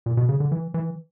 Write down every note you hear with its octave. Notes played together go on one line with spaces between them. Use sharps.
A#2
B2
C#3
D3
E3
E3